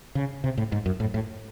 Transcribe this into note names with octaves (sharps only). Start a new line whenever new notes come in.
C#3
C3
A2
G#2
F#2
A2
A2